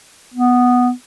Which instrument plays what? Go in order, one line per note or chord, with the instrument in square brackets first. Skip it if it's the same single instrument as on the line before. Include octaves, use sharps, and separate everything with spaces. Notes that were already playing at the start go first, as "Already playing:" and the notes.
[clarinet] B3